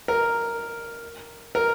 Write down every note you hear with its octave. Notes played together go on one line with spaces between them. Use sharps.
A#4
A#4